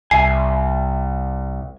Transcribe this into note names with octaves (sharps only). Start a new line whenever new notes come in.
C2 E5 G#5 C7